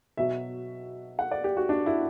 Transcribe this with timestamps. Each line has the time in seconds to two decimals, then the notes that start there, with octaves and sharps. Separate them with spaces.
0.17 B2 F#3 E5
1.19 F#5
1.31 D5
1.44 G4
1.57 F#4
1.69 D4
1.86 E4